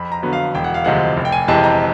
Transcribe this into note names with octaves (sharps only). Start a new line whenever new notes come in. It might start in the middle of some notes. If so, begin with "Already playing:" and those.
Already playing: F2 B5
A#5
D3 F#3 B3
F5
E1 G5
F#5
F5
D2 C3 F3 G#3 F#5
F1
G5
G#5
F2 C3 E3 G#3 A5
A#5